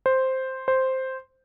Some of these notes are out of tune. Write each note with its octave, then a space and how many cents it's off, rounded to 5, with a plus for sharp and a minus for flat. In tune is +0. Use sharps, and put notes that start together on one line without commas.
C5 +0
C5 +0